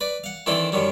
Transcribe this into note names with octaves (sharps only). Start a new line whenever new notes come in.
B4 D5
F5 F#5
D#3 E3 C4 D4 E4 A4
F#2 D#3 F#3 G3